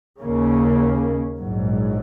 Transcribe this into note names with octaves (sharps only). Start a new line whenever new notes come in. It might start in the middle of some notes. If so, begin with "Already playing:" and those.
D#2 C#3 A#3 C#4
A#1 G#2 F#3